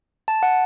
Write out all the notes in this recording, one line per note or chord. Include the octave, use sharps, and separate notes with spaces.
A5
F#5